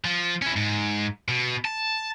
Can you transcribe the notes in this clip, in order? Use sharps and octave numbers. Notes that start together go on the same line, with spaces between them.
F3
C#4 E4
G#2
B2
A5